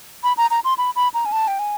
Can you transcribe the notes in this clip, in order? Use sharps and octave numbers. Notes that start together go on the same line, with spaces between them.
B5
A#5
A#5
C6
B5
B5
A#5
G#5
A5
G5
G#5